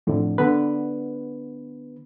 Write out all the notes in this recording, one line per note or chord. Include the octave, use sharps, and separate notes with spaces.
F2 A2 D3
D3 B3 B4